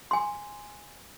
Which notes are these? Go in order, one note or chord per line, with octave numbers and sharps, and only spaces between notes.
G#5 C6